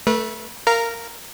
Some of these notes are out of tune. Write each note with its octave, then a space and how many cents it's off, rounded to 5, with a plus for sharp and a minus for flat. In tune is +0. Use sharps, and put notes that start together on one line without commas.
A3 +0 B4 -35
A#4 -10 F5 -15 A#5 +0